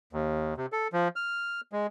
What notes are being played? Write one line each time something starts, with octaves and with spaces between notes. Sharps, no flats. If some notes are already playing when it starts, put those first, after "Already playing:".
D#2
C3
A4
F3
F6
G#3